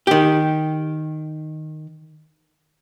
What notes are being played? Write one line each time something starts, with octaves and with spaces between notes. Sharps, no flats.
D#3 G4